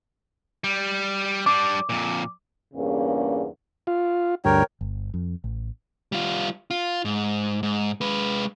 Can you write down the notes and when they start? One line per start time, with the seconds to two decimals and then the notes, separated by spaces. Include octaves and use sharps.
0.64 G3
1.46 G3 D4 D6
1.89 F2 A#2
2.74 E2 G2 C#3 A#3 C#4
3.87 F4
4.45 D2 G2 A#4 C#5 G5
4.81 G1
5.14 F2
5.44 A1
6.12 G3 F4
6.70 F4
7.05 G#2
7.63 G#2
8.01 G#3 B4